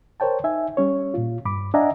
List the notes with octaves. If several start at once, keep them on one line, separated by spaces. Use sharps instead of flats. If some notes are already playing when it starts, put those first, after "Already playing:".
A#4 C5 C#5 G5 A5
D#4 E5 G#5
G3 C#4 C#5
A#2 F4
G2 B5 D6
D4 D#5 E5 F#5 G#5 A#5